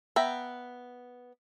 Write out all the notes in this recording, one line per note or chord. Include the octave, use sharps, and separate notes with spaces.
B3 E5 G5 A#5